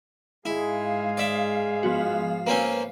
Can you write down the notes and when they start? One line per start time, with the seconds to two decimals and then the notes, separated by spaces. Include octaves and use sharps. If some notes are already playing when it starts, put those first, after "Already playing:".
0.45 G#2 G#3 E4 G#4 F5
1.17 D5 E5
1.83 F3 B3 F#4
2.47 A#3 C4 C#4 B4 C#5